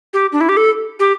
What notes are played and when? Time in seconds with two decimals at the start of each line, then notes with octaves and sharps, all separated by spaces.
0.13 G4
0.32 D4
0.41 E4
0.49 G4
0.57 A4
0.99 G4